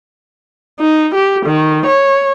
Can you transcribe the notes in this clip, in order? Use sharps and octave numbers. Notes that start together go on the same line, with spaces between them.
D#4
G4
D#3
C#5